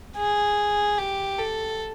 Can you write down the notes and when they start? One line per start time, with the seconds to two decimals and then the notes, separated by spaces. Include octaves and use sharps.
0.17 G#4
0.98 G4
1.38 A4